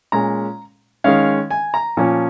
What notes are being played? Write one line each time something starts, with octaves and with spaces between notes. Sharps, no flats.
A#2 G#3 C#4 A#5
D#3 G#3 C#4 F5
G#5
A#5
A#2 F3 C#4